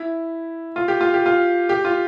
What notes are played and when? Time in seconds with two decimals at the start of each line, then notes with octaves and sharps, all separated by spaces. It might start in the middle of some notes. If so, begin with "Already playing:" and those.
Already playing: E4
0.76 F4
0.88 G4
1.01 F4
1.14 G4
1.26 F4
1.69 G4
1.85 F4